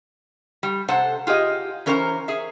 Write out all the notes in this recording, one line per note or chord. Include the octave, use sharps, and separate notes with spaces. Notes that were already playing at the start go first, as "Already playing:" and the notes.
G3
C3 A4 C5 F#5
F4 G4 G#4 D#5
E3 C#4 A#4 C5 E5 A#5
G#4 E5